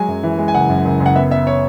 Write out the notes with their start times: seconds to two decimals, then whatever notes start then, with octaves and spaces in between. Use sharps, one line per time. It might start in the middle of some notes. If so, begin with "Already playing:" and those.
Already playing: F#3 G#3 G#5
0.08 F#2
0.23 E3
0.38 G#3
0.48 G#5
0.54 F#1 F#5
0.70 F#2
0.85 F#1
1.00 F#1
1.06 F#5
1.16 B3 E5
1.31 B3 E5
1.47 C#5